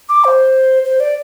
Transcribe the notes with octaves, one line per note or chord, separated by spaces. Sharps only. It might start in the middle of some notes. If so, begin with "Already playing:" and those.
D6
C5
C5
D5